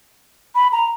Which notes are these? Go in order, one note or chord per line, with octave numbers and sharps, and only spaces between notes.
B5
A#5